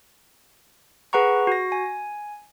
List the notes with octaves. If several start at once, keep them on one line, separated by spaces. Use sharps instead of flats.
G#4 B4 F#5 A#5 C#6
F#4 A#6
G#5